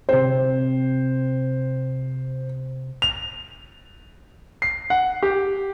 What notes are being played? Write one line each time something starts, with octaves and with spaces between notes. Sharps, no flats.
C3 C4 C5
F7
C7
F#5
G4